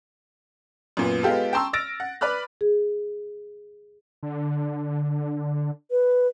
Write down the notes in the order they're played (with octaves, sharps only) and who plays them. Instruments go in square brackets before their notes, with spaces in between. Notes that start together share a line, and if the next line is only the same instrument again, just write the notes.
[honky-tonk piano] F#2 A#2 B3
G#3 B3 F4 G4 A4
G5 A5 A#5 C6 C#6 E6
E6 F6 A6 A#6 D7
F#5
B4 D5 B5 F6 F#6
[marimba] G#4
[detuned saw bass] D3
[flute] B4